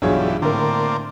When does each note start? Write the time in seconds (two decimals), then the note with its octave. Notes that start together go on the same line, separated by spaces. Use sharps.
0.02 B1 G2 E3 D4 F4 F#4 G#4 C#5
0.42 A2 D3 A#3 C4 D4 A#4